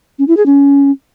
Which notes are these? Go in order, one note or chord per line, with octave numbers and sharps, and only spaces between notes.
C#4
E4
G#4
C#4